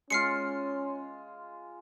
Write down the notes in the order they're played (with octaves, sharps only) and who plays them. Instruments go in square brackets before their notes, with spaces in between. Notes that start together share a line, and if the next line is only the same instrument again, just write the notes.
[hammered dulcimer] G#3 F4 [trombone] C#4 [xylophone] F6 C7 C#7